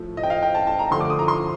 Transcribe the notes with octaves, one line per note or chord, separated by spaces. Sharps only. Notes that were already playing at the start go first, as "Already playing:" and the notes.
Already playing: A2 F3 A3
D#5
G5
F5
G5
A5
A5
A#5
D3 F3 A3 C6
D6
D#6
A#5
C6